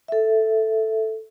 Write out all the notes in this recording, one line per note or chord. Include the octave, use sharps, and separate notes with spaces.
A4 E5